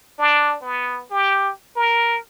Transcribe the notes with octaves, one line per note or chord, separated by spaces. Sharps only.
D4
B3
G4
A#4